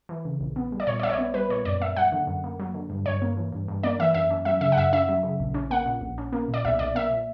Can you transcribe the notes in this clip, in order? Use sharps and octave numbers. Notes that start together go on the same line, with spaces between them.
E3
C#3
A#1
B3
G3
D5
A#2 C#5
D5
A#1 E5
C#5
D5
B3
G3 B4
A#2 C#5
F#2 D5
A#3 E5
F#3 F#5
D3
F#2
A#3
F#3
D3
G2
G2 C#5
A#3
E3
G2
G2
A#3 D5
E3 E5
F#2 E5
C#4
F#3 E5
C#3 E5
F#5
F#2 E5
C#4 E5
F#3
C#3
A#1
C#4
A#3 F#5
A#2
A#1
C#4
A#3
A#2
D5
B1 E5
B1 D5
A#3 E5
A#2